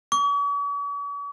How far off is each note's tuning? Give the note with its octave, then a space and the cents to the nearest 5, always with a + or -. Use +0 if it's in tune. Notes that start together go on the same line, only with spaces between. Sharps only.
C#6 +45